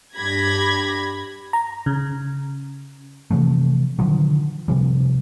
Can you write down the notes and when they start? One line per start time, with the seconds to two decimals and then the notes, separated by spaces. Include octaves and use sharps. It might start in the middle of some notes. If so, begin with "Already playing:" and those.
0.15 G2 D4 G4 B5 G#6 A#6
1.53 A#5
1.86 C#3
3.31 C3 E3 F3 A3
3.99 D3 D#3 F3 F#3
4.68 C3 F3 G3